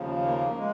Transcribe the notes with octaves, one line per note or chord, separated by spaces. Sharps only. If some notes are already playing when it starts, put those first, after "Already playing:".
Already playing: D#2 C#3 F3
A#3
G#3